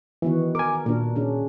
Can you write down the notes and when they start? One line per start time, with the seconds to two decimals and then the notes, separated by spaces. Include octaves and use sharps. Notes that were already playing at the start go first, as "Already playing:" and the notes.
0.22 D#3 E3 B3 F#4
0.55 A#4 G#5 D6
0.86 A#2 D4 F#4 A#4
1.16 C#3 C#4 D4